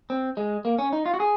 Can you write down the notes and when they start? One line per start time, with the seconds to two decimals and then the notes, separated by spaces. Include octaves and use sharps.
0.10 C4
0.37 G#3
0.65 A#3
0.78 C#4
0.93 D#4
1.06 F4
1.14 F#4
1.20 G#4